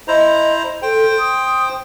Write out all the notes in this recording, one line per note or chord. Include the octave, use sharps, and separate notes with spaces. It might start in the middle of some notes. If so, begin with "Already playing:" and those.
E4 C5 D#5 A#5
A4 C5 G5
D#6